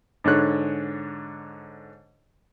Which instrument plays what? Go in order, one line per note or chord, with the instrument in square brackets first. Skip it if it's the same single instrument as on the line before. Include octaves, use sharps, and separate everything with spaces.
[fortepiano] G#2 D3 C#5 F#6